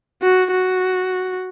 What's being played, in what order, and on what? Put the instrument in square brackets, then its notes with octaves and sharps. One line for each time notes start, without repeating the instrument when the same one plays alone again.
[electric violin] F#4
F#4